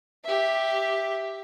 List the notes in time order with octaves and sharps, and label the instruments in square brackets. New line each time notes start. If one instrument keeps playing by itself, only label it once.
[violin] G4 E5